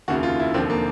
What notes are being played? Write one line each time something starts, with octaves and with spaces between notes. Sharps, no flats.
F1 D#2 C#3 F#4
F4
E4
E1 D#2 D3 F3 C4
A#3